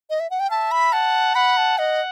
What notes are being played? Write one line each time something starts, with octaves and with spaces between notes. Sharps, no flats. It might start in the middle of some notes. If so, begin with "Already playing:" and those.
D#5
E5
F#5
G5
E5 A5
B5
F#5 A5
F#5 B5
A5
D#5 F#5